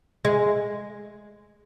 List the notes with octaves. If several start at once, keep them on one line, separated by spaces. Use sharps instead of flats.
G#3